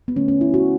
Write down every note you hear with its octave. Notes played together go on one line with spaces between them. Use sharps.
B3
D3 A3 C#4
C#4
E4
F#4